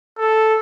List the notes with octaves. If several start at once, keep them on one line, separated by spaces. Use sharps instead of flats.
A4